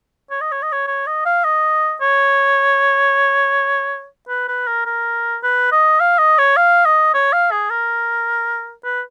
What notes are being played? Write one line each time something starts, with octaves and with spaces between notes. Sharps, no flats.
C#5
D#5
C#5
D#5
C#5
C#5
D#5
F5
D#5
C#5
B4
B4
A#4
A#4
B4
D#5
F5
D#5
C#5
F5
D#5
C#5
F5
G#4
A#4
B4